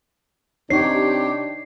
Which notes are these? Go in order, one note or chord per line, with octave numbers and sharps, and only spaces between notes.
C3 D4 D#4 G4 C#5 C7